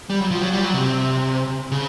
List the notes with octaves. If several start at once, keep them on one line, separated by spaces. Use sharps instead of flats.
G3
F#3
F3
F#3
G3
F#3
C3
C#3